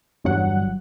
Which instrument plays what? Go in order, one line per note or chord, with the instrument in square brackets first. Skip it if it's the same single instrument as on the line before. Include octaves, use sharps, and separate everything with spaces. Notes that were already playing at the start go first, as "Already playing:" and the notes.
[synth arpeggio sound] G1 E2 G2 F#3 F#5